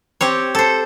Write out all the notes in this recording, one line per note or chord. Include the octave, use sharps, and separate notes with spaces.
C4 G4 C#5
A4 C5